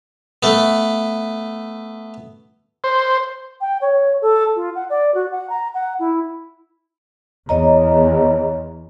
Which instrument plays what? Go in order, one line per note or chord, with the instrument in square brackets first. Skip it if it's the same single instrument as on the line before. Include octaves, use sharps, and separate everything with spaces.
[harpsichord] A3 B3
[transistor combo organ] C5
[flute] G5
C#5
A4
F4
F#5
D5
F#4
F#5
A#5
F#5
E4
[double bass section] E2 [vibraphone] C#5 D#5 A#5